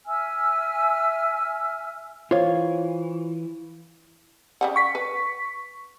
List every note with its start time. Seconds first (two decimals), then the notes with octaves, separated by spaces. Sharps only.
0.07 E5 G#5 E6 F6
2.31 E3 F4 C5 C#5
4.61 C#3 G3 F#5
4.76 C#6 B6
4.95 B4